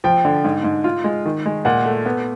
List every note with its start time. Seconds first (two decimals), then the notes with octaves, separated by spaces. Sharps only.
0.04 F3 G5
0.25 D3
0.44 G#2
0.64 G#2
0.84 F4
1.04 G#3
1.25 D#3
1.46 G#3
1.65 A#2 F#5
1.85 A3
2.06 B3